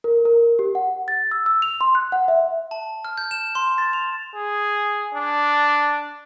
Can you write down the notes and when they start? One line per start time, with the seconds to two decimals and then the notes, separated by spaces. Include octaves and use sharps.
0.04 A#4
0.25 A#4
0.59 G4
0.75 F#5
1.08 A6
1.31 E6
1.46 E6
1.62 F7
1.81 C6
1.95 F#6
2.12 F#5
2.28 E5
2.71 A5
3.05 F6
3.18 G6
3.31 E7
3.55 C6
3.78 A6
3.93 F7
4.35 G#4
5.14 D4